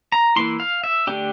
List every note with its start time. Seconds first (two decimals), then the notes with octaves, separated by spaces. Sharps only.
0.12 A#5
0.36 E3 A#3 E4 C6
0.60 F5
0.84 E5
1.07 D3 A3 D4 G4